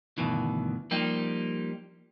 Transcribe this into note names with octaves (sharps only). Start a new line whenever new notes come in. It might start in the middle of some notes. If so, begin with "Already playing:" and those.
D2 G2 B2 D#3 E3
F3 G3 A#3 D#4 G4